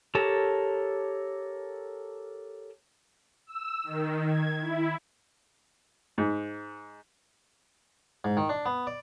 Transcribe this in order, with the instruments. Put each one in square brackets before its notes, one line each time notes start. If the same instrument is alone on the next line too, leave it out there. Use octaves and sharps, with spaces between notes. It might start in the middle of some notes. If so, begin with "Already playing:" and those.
[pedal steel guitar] G4 A4 A#4 C#5 A5
[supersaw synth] E6
D#3
G#6
E4
[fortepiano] G#2
[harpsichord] G#2
D#3
D4
B3
D5